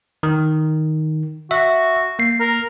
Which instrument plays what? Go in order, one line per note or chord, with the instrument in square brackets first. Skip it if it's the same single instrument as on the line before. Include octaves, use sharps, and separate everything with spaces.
[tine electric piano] D#3
[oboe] F#4 [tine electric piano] E5
[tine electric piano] A#3 C7
[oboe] A#4